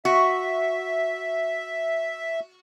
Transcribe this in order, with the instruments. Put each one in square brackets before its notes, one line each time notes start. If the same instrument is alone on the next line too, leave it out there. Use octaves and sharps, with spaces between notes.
[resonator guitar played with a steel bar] F#4 [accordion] E5